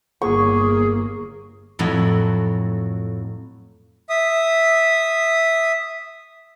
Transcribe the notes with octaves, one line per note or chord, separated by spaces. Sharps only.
G1 A#3 G#4 C#6
F2 A2 F#3
E5 D#6